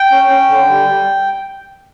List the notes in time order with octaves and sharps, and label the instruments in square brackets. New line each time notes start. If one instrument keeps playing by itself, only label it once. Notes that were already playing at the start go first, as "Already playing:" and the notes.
Already playing: [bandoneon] G5
C#4
C#4
D3
G3
G3